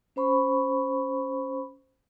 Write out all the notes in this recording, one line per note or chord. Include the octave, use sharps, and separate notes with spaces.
C#4 C5 B5 C#6